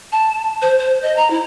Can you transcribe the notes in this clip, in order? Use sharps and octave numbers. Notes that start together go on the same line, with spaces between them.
A5
C5
C5
D#5
A#5
E4